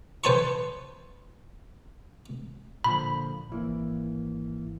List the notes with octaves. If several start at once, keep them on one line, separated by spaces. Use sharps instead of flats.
B4 C5 G#5 A5 C6 C#6
A#2 D3 F3 B5
G#1 E3 A#3